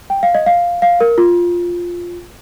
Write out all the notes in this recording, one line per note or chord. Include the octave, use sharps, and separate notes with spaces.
G5
F5
D#5
F5
F5
A#4
F4